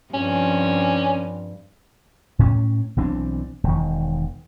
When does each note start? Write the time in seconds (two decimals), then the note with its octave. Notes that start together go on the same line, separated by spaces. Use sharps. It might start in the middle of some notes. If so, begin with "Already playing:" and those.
0.14 G2 F3 C4 C#4
2.39 A2 C#4
2.97 B1 E3 C4 D4
3.64 E1 D#3